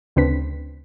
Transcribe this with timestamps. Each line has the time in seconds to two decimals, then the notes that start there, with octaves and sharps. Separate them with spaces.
0.16 D2 C#3 C4 D4 B4 B6